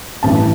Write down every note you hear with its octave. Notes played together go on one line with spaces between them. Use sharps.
A1 G2 E3 A5